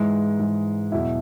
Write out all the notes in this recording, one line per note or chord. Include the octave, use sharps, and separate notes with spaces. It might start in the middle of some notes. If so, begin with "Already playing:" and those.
Already playing: G#2 E3 G#3
G#2 E3 G#3
E2 B2 F#3 E4